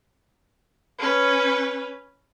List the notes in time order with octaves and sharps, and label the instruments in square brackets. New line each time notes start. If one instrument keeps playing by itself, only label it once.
[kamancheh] C#4 B4